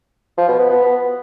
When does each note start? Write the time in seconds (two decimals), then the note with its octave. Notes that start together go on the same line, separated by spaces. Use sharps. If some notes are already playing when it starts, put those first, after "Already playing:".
0.38 F3
0.48 B2
0.59 B3
0.70 B3